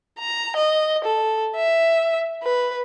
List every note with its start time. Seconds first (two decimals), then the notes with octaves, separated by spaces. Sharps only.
0.20 A#5
0.56 D#5
1.04 A4
1.56 E5
2.43 B4